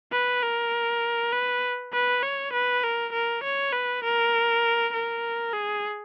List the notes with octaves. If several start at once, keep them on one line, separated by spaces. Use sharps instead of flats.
B4
A#4
B4
B4
C#5
B4
A#4
A#4
C#5
B4
A#4
A#4
G#4